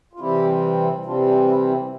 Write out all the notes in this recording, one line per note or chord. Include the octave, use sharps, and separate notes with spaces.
F4
C3 E3 G3 C4 E4 G4
C3 E3 G3 C4 D4 F4
D4
E4
E4